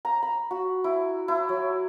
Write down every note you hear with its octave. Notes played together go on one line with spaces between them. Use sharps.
A#5
B5
F#4
E4
E4
F#3